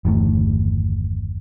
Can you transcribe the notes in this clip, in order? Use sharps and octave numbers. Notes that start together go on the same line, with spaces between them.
G1 E2 D#3 A3